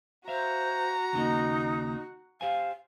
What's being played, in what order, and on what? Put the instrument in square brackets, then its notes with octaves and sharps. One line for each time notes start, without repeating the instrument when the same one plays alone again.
[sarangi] F#4 [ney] C5 [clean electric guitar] E5 F5 [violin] A#5
[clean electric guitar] D#2 C#3 A#3 [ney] D#4
[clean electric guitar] G4 C5 G#5 [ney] F5